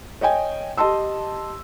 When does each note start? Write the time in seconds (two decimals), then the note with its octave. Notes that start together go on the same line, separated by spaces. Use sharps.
0.21 C#5 D#5 G5 G#5
0.77 G4 D#5 A5 C6 E6